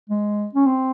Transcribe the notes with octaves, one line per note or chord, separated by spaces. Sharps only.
G#3
C#4
C4